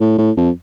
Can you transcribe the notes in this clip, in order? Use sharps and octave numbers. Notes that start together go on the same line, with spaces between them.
A2
A2
F2